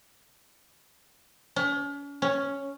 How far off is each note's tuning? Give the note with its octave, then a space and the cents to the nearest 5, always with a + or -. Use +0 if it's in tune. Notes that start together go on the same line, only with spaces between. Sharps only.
C#4 +40
C#4 +0